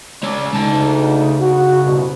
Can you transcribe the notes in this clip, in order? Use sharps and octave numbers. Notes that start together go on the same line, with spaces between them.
G#3 C#4 C#5 D5
D2 C#3 D#4 A5
F#4
C2 F#2 B2